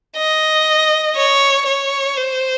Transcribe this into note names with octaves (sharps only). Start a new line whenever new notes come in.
D#5
C#5
C#5
C5